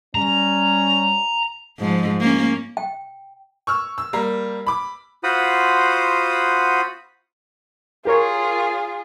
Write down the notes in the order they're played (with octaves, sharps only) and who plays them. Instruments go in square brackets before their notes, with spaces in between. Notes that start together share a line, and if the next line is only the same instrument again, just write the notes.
[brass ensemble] G3 C#4 [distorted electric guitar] A#5
[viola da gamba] G#2 F3
A#3 C#4
[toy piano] G5
[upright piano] C#6 E6 F6
E6
G3 A#3 A#5
B5 D6
[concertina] F4 F#4 C5 F#5 B5 D#6
[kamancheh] F4 G#4 [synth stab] G4 A#4 C#5